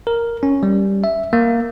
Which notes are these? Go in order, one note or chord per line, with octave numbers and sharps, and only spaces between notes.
A#4
C#4
G3
E5
A#3